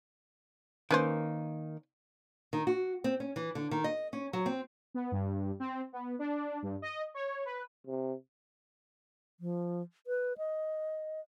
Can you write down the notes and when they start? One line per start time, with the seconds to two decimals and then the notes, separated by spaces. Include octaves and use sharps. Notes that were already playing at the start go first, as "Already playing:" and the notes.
0.91 D#3 A#3 C#4 B4 C5
2.53 D#3
2.67 F#4
3.04 C4
3.20 C#4
3.36 E3
3.55 D3
3.71 D#3
3.84 D#5
4.13 C#4
4.33 F#3
4.46 C4
4.94 B3
5.12 G2
5.60 C4
5.93 B3
6.19 D4
6.63 G2
6.82 D#5
7.14 C#5
7.45 B4
7.87 C3
9.40 F3
10.07 B4
10.38 D#5